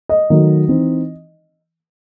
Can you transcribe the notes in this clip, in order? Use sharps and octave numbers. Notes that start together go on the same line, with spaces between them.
D#5
D#3 F#3 A3
E3 C4 D#4